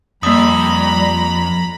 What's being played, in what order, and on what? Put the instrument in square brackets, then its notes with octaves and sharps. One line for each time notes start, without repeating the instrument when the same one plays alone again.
[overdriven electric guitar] F2 [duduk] G3 [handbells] A#3 D#6 [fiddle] A#5 B5